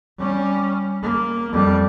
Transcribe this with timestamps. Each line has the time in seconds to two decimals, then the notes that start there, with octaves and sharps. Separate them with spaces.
0.18 G3 C#4
1.03 A#3
1.52 F2 G3